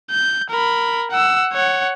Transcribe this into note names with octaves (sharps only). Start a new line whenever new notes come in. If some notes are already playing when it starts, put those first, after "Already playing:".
G6
A#4 B5
F#5 E6
C#5 F#5